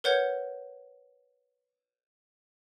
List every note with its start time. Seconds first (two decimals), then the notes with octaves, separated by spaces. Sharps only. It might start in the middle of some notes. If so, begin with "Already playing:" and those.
0.04 A#4 B4 C#5 F#5 G6 G#6